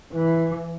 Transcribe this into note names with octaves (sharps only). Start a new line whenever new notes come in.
E3